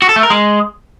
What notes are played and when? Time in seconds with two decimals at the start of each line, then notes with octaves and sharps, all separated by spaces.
0.02 F#4
0.09 A4
0.16 A3
0.23 A#4
0.30 G#3